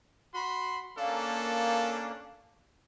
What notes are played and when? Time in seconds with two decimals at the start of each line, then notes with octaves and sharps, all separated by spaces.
0.35 F#4 B5 C6
0.98 A#3 C#4 D4 A4